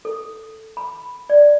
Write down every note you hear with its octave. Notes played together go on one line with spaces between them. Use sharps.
A4
B5
D5